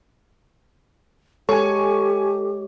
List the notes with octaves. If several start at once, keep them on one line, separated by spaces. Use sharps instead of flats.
G#3 G4 A4 C#5 G#5 C#6